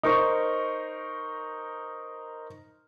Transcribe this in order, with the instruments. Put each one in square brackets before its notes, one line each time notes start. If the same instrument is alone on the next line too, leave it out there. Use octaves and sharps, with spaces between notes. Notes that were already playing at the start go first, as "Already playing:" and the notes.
[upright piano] D#4 A#4 C5 C#6